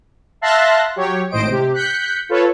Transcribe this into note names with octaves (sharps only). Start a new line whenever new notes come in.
E5 F5 A5 C6 F#6 A#6
F#3 G4 C#5
G#1 A2 C5 D#5 D7
C3 G4
F#6 G6 B6 C#7
F4 A4 B4 C#5